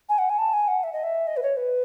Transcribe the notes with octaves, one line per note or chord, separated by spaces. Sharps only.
G#5
F#5
G#5
A5
G#5
F#5
E5
D#5
E5
D#5
B4
C#5
B4